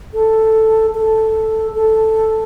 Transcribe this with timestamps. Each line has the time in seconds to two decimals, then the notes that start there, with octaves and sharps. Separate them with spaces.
0.14 A4
0.95 A4
1.75 A4